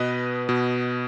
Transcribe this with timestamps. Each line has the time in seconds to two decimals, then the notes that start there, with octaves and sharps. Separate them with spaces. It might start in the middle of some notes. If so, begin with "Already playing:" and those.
Already playing: B2 B4 D#5
0.49 B2